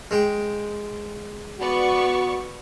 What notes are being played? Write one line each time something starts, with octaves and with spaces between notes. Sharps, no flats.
G#3 G5
B3 F#4 D5 C#6